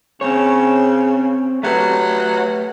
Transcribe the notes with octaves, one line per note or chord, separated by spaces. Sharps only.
C#3 C4 C#5
F#3 A3 G4 B4